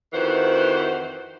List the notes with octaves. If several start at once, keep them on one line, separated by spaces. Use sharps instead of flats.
F2 D#3 E3 F#4 C5 F#5